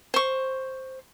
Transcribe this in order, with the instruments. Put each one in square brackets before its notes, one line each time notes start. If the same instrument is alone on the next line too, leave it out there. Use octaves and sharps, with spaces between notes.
[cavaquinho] C5 C#6